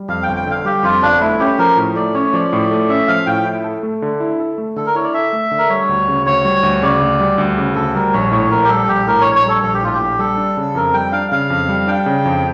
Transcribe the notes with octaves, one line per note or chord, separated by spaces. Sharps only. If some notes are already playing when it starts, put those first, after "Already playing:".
Already playing: G3
F2 F5
G5
G1
G5
D3 F5
G3 G4
F2 F4
G1 D4
A3 E4
C#4 G4
F3 A#4
A2
A3 D5
C#4 C#5
F3 D5
A2
A3
C#4 E5
F3 F5
A2 G5
E4
A4
A3
D3
E4
A4
A3
D3 A4
A#4
E4 C#5
D5
A4 E5
A3
D3
A#4
G3 C#5
D2
C#3
D2 C#5
G3
D2
C#3 D5
D2
G3
D2
C#3
D2 A4
G3 A#4
A#1 C#5
A2 C#5
A#1 A#4
G4
G3 A4
A#1 G4
A2 A#4
C#5
A#1
C#5
G3 A4
A#1 A4
G4
A2 F4
G4
A#1
G3 A4
D4
C#3
F2 A#4
G3 G5
D4 F5
C#3 F5
F2
G3
D4 G5
C#3
F2